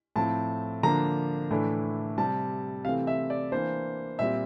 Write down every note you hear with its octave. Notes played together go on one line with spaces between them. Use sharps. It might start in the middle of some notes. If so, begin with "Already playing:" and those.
A2 F3 C4 A5
D3 F3 A#3 D4 A#5
A2 E3 A3 D4
C3 G3 C4 A5
C3 E3 A3 C4 F5
E5
D5
E3 A#3 D4 C5
A#2 G3 C4 E5